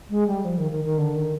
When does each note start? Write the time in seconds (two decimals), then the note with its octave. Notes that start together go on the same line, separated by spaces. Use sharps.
0.09 G#3
0.27 G3
0.44 F3
0.57 D#3
0.70 D#3
0.84 D#3
0.98 D3
1.15 D#3